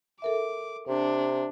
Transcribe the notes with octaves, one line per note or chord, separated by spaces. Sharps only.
A4 A#4 E5 D6
C3 D4